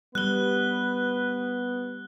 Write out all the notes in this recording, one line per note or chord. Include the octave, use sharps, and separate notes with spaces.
G3 B3 B4 F#6 G7